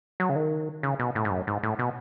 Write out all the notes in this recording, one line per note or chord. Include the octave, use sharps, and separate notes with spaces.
F#3
C#3
D#3
C#3
B2
A2
G#2
F#2
G#2
A2
B2